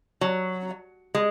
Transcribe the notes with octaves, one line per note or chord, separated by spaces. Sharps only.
F#3
G#3